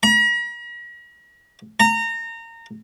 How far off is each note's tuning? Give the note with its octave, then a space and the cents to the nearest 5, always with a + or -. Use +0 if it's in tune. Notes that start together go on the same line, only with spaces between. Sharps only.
A#5 +45
A#5 -25